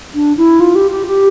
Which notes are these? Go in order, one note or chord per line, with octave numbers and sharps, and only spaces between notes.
D4
E4
F4
G4
G4
G4